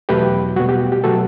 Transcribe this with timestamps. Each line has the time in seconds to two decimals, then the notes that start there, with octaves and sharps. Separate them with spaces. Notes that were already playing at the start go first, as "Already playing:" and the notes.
0.09 E2 B2 F#3 A3 G4 B4
0.56 G3 F#4
0.60 B2
0.69 G4
0.92 G4
1.04 B2 F#3 A3 F#4 A4